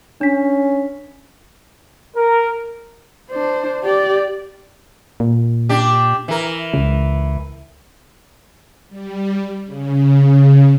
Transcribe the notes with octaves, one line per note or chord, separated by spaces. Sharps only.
C#4 D4 B6
A#4
D4 C5
G4 D5
A#2
D4 G4
E3 A#4
C#2
G3
C#3